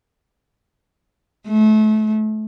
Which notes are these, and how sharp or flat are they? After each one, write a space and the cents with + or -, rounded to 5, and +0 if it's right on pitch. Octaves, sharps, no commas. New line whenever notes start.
A3 -30